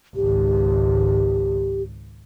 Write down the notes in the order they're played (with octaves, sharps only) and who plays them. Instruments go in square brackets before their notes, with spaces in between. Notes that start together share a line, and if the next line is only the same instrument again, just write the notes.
[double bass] G#1 C#2 [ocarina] G4